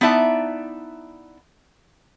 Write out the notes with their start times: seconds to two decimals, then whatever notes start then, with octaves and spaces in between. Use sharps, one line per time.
0.01 B3 D#4 E4 D5 E5 A5